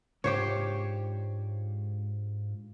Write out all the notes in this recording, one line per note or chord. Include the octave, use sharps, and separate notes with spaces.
G#2 D4 F4 G4 C5 C#5